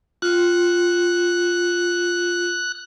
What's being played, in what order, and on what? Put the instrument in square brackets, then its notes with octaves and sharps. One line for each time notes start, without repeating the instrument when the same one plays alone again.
[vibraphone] F4 [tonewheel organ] F#6